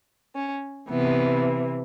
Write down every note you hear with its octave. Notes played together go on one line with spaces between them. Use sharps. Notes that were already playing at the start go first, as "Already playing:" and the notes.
C#4
C3 E3 B3